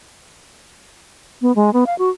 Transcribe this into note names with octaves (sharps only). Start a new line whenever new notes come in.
B3
G#3
B3
F5
F#4